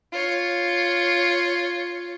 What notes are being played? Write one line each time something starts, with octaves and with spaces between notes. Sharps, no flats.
F4 C#5